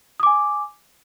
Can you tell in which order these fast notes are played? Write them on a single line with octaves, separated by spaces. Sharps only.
D#6 D6 G#5